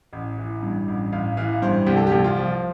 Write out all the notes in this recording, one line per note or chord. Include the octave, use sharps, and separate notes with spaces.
A1
E3
G2
A1
A1 F5
E3 F5
G2 C5
C2 G4
A4
G4
C2
F4
F3